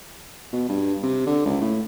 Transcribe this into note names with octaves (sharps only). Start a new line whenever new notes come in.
B2
G2
C3
D3
C#2
A2